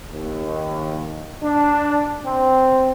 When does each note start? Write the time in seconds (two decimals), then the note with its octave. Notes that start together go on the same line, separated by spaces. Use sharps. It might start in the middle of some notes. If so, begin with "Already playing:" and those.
0.13 D#2
1.43 D4
2.25 C4